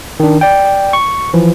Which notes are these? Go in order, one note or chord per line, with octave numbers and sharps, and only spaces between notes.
D#3 D4
D5 G5
C#6
E3 F3